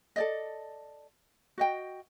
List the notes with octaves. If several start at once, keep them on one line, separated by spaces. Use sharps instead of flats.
A4 D5 D#5
F#4 D#5 G5